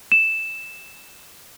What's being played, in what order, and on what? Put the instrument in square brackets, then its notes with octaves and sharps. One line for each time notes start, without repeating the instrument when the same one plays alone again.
[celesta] E7